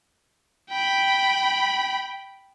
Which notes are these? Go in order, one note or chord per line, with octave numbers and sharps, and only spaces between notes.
G5 B5